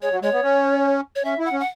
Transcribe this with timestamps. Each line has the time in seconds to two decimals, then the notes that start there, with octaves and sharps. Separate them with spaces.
0.02 G#3 C#5
0.12 F#3
0.22 G#3 C#5
0.33 B3
0.43 C#4
1.15 C#5
1.25 C#4 E5
1.39 E4
1.45 F#5
1.53 C#4
1.60 F#5